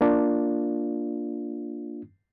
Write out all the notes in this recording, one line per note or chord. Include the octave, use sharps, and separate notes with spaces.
A#3 D4 F4